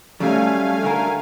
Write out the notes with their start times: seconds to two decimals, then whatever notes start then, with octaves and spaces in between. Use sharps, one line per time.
0.20 F#3 G3 A3 C#4 F5 G#5
0.82 D3 F#4 A#4